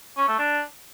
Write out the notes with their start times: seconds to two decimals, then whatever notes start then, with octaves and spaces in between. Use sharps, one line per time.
0.17 C#4
0.28 A3
0.39 D4